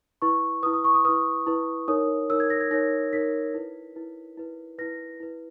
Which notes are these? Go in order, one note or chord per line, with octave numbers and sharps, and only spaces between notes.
E4 B4 C#6
E4 B4 D#6
D#6
C#6
D#6
E4 B4 D#6
E4 B4
D#4 A#4 C#5 D#6
D#4 A#4 C#5 E6
G#6
A#6
G#6
D#4 A#4 C#5 A#6
D#4 A#4 C#5 B6
E4 B4
E4 B4
E4 B4
E4 B4 A#6
E4 B4